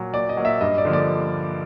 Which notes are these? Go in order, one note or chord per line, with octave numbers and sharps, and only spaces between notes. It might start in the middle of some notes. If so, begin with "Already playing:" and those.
Already playing: A#2 F#3 A#3
A#2 D5
D#5
F#3 A#3
E5
G2 D#5
D5
D3 F3 A#3
D5